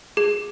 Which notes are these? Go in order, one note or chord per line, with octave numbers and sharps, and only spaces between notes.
G#4